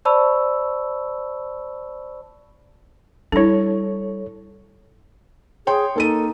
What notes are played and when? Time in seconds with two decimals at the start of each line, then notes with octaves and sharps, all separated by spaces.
0.05 C5 D5 A5 B5 C#6 E6
3.32 G3 D4 E4 A4 C#5
5.67 G#4 C#5 G5 C6
5.96 A#3 D#4 A4 D#7